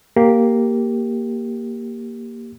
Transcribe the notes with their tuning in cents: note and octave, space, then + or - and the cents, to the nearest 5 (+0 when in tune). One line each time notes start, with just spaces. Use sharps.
A#3 +0 G4 +0